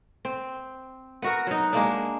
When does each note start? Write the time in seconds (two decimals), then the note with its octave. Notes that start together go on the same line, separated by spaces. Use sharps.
0.25 C4
1.22 B3 F#4 A#4
1.47 F#3 D#4
1.73 G#3 A#3 D4